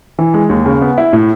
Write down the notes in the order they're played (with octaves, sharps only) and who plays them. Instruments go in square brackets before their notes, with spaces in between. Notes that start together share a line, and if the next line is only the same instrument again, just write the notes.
[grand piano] E3
G#3
D#2
C#3
B3
E4
A2